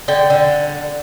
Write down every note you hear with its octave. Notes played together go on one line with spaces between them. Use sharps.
D3 G5
D3